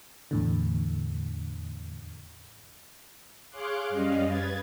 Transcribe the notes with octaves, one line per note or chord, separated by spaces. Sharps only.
E2 A2 D3
G#4 C#5 F5 C6 D6 F#6
F#2 G3 C#4 D#5 F5
B4 G#6 A6